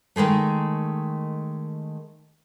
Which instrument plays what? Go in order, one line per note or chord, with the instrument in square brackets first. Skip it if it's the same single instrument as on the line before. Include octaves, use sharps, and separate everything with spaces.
[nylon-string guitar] D#3 E3 G#3 A3